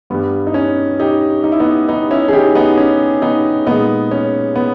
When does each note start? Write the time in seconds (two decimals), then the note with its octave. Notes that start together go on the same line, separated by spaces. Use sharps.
0.10 G2 G3 B3
0.47 D#4
0.54 C#4
1.00 D#4 G4
1.44 D#4
1.52 E4
1.60 B3 D#4
1.88 B3 D#4
2.11 C#4 E4
2.28 G#4
2.33 D#4 G4
2.55 B3 D#4
2.77 C#4
3.22 B3 D#4
3.66 A#2 G#3 B3 D#4
4.11 C#4
4.56 B3